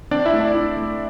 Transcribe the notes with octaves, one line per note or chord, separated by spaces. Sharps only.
C4 D4 D5
E4 E5
A3
D4 D5
E4
A3